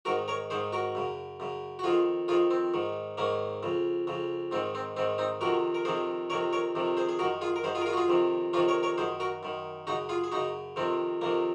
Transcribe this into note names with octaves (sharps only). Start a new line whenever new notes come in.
G#2 D#3 F#4 A#4
A#4 C#5
G#2 D#3 G#4 C5
F#4 A#4
F#2 C#3
F#2 C#3
F#4
F2 D#3 F4 G#4
F2 D#3 F4 G#4
C4
G#2 D#3
G#2 D#3 A#3 C#4
F2 C#3
F2 C#3
G#2 D#3 C4
C4
G#2 D#3 C4
C4 D#4
F2 C3 D#3 F#4 A#4
A#4
F2 C3 D#3 G#4 C5
F2 C3 D#3 A#4 C#5
A#4 C#5
F2 C3 D#3
G#4 C5
G#4
F#2 D#3 F#4 A#4
F4 G#4
A#4
F#2 D#3 G#4 C5
F4 G#4
A#4
F4 G#4
F#4
F4 G#4
F2 C3 D#3
F2 C3 D#3 C#4 F4
A#4 C#5
A#4 C#5
F#2 D#3 G#4 C5
F#4 A#4
F#2 D#3
F#2 C#3 D#4 F#4
F4 G#4
G#4
F#2 C#3 D#4 F#4
F2 C3 D#3 C4
F2 C3 D#3 A#3